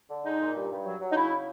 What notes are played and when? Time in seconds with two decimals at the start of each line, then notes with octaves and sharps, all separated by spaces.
0.09 D3
0.25 G#3 D#4
0.40 A#2
0.55 G2
0.70 G2
0.85 F#3
1.01 F#3
1.11 D#4
1.16 C#3 E4